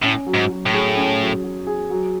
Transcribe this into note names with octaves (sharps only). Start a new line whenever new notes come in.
A2 C#4
F#3
G#2
F#3
A2
G#4
C#4
F#3
F#3
G#4
F#3